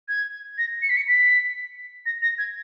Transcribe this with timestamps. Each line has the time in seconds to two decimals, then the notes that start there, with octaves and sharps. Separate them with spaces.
0.08 G#6
0.58 A#6
0.82 C#7
0.90 B6
0.97 C#7
1.07 B6
2.06 A#6
2.22 A#6
2.38 G#6